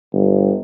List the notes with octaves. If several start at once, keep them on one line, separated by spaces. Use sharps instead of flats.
G1